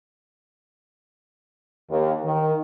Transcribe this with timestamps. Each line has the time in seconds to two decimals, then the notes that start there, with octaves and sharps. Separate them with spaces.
1.90 D#2
2.24 D#3